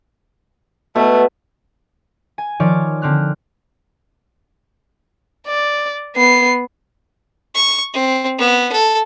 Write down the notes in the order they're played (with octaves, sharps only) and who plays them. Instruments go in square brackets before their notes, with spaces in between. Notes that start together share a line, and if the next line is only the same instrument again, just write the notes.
[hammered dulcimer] B2 [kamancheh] A3 B3
[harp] G#5
D#3 F3 C#5 D5 F6 G#6
D3 C4 F6 F#6
[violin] D5
B3 C7
[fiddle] C#6
C4
B3
A4